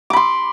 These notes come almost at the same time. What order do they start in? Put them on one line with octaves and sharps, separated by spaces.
D6 B5 C6